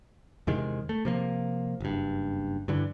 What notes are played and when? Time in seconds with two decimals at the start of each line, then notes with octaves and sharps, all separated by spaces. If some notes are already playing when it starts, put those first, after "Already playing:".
0.47 E2 C3 D#3 G#3
0.89 A3
1.05 C3 F3 A#3
1.80 F#1 G2
2.68 G2 D3 E3